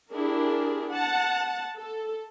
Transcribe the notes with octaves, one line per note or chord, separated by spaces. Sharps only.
D4 E4 G4 G#4 A#4
F#5 A5
A4